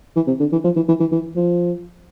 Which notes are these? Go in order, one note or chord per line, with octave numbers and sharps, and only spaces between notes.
E3
C3
D3
E3
F3
E3
E3
E3
E3
F3